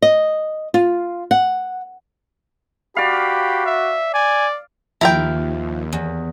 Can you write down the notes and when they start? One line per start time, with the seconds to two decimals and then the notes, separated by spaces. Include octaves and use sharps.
0.02 D#5
0.74 F4
1.31 F#5
2.96 F#4 G4 D5 F5 B5
3.66 E5
4.14 D5 G#5
5.01 D#2 F3 E4 A#4 G5
5.93 E2